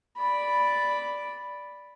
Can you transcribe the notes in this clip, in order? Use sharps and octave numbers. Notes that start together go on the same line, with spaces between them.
D5 B5